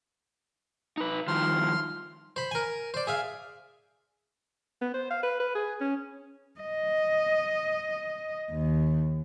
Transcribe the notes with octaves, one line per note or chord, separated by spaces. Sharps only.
D#4 B4
D#3 F3 G3 C6 F6
C5 B5
A#4 G#5
C5 D5
G#4 E5 F5
B3
C5
F5
B4
B4
G#4
C#4
D#5
D#2